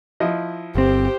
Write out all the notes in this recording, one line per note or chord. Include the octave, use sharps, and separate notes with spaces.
F3 E4 D#5
G1 C4 G4 C5